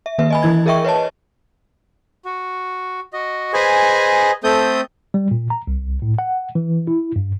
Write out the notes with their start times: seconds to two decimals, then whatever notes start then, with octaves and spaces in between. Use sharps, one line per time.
0.06 E5
0.18 D#3 A#3 B4 E5
0.30 D#5 G#5 B5
0.43 E3 E4 G#6
0.66 G#4 A#4 D#5 E5 G5 C#6
0.84 B4 C#5 D#5 A5
2.25 F#4
3.13 F#4 D#5
3.53 G#4 B4 C5 D#5 G#5
4.44 A3 C4 A4 D#6 G6
5.14 G3
5.31 A#2
5.50 A#5
5.67 C2
6.02 A2
6.19 F#5
6.55 E3
6.87 E4
7.16 G2